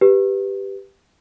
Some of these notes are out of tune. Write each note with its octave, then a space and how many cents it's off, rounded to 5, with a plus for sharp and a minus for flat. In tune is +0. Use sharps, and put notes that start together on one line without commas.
G4 +0 B4 +0